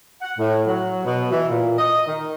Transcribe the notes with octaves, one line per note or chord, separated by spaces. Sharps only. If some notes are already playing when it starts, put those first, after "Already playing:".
F#5
A2
F#3
B2
E3
A#2
D#5
D#3